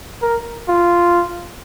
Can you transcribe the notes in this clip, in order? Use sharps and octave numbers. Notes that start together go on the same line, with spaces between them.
A#4
F4